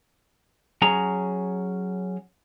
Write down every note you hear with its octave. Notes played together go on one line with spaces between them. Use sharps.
F#3 C#4 G#4 A#5